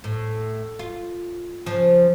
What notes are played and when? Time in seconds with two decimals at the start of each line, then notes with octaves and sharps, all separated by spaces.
0.04 A2
0.79 F4
1.66 C#3 F3